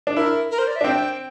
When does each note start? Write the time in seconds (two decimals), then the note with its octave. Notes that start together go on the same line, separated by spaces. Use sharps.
0.07 D4
0.16 E4 A#4
0.51 A#4
0.59 C5
0.67 D5
0.76 E5
0.81 D4
0.84 C4 G5